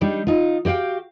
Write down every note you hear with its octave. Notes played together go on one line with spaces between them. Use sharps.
G3 D4 D#4 G4
D#4 F4
F#4 G4 D5 F5 G5